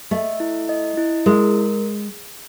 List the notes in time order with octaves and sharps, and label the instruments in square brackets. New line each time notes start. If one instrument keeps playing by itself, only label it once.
[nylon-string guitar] A3 [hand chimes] D#5
[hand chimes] E4
D#5
E4
[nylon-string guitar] G#3 [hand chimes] A#4